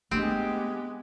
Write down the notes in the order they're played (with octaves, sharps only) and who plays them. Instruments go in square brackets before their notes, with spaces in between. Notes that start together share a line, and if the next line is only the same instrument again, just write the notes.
[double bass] G#3 B3 [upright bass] A3 D4 [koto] C4 [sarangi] G4